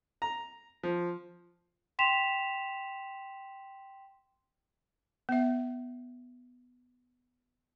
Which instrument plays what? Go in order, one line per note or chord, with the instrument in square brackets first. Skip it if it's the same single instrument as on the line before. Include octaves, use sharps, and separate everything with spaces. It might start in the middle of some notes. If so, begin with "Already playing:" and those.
[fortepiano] A#5
F3
[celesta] G5 C6 B6 E7 F7
[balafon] B3 E5